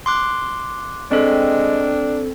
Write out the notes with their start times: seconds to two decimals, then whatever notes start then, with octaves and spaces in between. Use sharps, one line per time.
0.06 C6 D6 F#6
1.11 G#3 C4 D4 A4